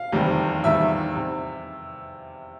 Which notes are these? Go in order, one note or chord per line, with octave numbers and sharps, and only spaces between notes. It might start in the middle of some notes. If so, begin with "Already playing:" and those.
Already playing: F5
F1 E2 C3 D#3 G3
F1 E2 C3 D#3 G3 E5
C3